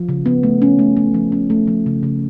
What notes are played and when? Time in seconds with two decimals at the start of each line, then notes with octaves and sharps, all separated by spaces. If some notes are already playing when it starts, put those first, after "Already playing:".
Already playing: F3
0.09 C#3
0.26 B3
0.43 A3
0.62 C#4
0.79 A3
0.97 A3
1.14 F3
1.32 C#4
1.50 A3
1.67 F3
1.86 C#3
2.03 C#3